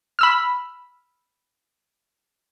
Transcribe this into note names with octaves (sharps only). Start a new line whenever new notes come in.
B5 E6 F6